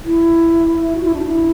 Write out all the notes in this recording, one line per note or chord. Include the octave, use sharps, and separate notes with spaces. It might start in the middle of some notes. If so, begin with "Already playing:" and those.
E4
F#4
E4
D4
E4